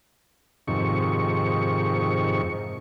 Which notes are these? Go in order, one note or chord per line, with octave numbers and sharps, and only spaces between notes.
F2 G#2 C3 D#3 C#6